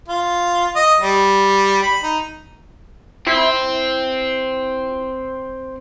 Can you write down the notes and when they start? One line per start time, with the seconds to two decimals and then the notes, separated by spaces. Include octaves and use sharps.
0.09 F4
0.76 D#5
1.01 G3
1.83 B5
2.04 D#4
3.27 C4 E4